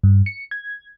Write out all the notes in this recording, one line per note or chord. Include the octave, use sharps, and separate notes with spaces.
G2
C#7
G#6